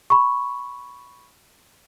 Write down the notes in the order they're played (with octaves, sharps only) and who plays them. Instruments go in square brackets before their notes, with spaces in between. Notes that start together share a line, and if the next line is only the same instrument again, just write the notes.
[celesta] B5 C#6